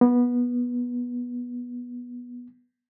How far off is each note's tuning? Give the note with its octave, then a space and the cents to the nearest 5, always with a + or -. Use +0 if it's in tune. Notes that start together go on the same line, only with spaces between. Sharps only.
B3 -15